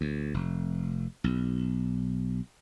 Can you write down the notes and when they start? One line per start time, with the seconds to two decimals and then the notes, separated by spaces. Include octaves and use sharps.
0.01 D2
0.34 F1
1.24 B1